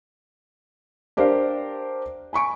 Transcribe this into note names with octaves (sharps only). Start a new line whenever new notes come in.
D4 G4 A#4 C5 D5 F5
G#5 B5 C#6 D7